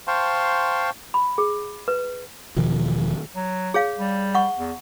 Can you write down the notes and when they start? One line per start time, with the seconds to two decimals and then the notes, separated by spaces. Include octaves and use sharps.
0.07 C5 F5 G5 A5 C6 C#6
1.14 B5
1.38 G#4
1.88 B4
2.56 E1 B2 D#3 F3
3.36 F#3
3.74 G#4 C#5 F5
3.98 G3
4.35 F#5 C#6
4.58 E2